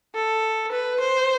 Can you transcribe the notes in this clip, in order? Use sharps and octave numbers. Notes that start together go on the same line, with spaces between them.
A4
B4
C5